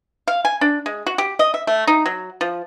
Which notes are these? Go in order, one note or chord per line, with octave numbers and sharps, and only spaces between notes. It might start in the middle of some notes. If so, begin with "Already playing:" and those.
F5
G#5
D4
G#3
F#4
G4
D#5
E5
A3
D#4
F#3
F3